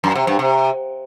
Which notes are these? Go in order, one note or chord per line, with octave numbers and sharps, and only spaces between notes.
F#2
C3
G2
C3